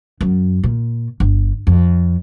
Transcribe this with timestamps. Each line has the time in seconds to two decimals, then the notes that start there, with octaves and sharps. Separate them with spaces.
0.21 F#2
0.64 A#2
1.20 G1
1.67 F2